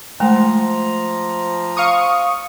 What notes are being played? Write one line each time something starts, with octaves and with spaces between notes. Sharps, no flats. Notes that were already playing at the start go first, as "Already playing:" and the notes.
F3 G#3 A3 A#5
F5 C#6 D#6